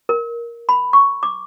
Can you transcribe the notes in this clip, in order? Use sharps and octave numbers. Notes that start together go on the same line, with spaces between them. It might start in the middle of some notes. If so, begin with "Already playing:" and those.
A#4
B5
C#6
D6